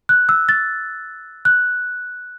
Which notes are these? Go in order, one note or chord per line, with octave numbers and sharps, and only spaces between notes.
F#6
E6
A6
F#6